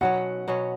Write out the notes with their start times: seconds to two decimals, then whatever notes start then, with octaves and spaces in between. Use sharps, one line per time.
0.01 B2 F#3 C#4 F#5
0.48 B2 F#3 C#4